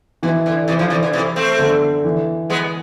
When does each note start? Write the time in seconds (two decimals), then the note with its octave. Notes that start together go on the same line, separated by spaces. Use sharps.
0.23 B2 E3
0.46 D3
0.68 C3 E3
0.79 D3 F3
0.90 C3 E3
1.03 D3
1.13 C3 E3
1.36 A3 C4
1.59 D3
2.04 E3
2.50 G#3 B3